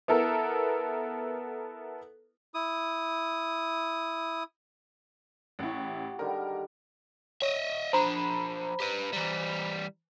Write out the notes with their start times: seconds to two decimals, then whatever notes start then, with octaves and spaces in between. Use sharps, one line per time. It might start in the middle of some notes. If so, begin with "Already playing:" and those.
0.08 B3 E4 A4 A#4
2.54 E4 D#6
5.59 A1 E4 F#4 G4
6.19 D3 D#3 G3 A#4
7.42 C#5 D#5 E5
7.93 F3 D4 C5 A#5 B5
8.80 G4 B4
9.13 E3 G3